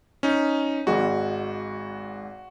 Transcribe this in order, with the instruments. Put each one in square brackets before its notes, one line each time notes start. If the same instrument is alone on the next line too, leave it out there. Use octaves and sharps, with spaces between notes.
[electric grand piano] C#4 D#4
[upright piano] G#1 G#2 [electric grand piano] F#4